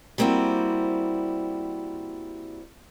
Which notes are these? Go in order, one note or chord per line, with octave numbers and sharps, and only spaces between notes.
G3 A#3 C4 E4 F#4